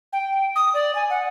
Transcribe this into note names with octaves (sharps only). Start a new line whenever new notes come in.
G5
D#6
D5
G#5
F#5